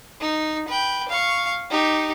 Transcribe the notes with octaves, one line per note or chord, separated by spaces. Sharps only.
D#4
B4 G5
F5 C#6
D#4 G4